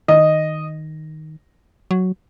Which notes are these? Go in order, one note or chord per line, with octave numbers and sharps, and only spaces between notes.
D#3 D#5
F#3